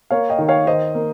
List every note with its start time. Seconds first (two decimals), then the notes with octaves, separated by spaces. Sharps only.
0.11 A#3 C#5 F5
0.29 D#5 G5
0.39 D#3
0.49 C#5 F5
0.67 D#3 C5 D#5
0.95 A#3